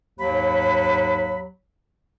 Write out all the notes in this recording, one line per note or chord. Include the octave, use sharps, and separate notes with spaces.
D#2 G#2 F#3 B5